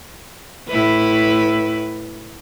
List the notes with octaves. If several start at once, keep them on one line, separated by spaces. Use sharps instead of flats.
A2 E4 B4